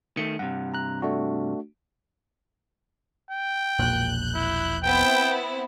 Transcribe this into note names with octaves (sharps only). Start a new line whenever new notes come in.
D#3 A3 C#7
G2 C3 F#5
A#5 F#6
A3 D4 F#4
G5
E1 A#1 A#2 F#6 G6
E4
B3 C4 E4 G5